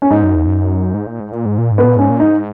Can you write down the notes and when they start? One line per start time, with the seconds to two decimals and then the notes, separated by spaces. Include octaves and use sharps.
0.02 C#4
0.10 G#2 D#4
0.23 F#2
0.35 E2
0.47 F#2
0.94 G#2
1.07 A#2
1.20 G#2
1.32 A#2
1.46 G#2
1.58 A#2
1.71 G#2
1.78 B3
1.84 A#2
1.96 G#2 C#4
2.10 A#2
2.20 G#2 D#4